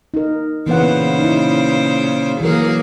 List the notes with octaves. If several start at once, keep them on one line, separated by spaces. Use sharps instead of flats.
D#4 A#4
A#2 C#3 E3 B3 C5 F#5
D#4 E4
E3 F#3 A#3 G#4 A#4